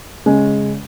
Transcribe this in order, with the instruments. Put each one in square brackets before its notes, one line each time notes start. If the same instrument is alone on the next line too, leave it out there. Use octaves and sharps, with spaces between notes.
[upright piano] C#3 G#3 C#4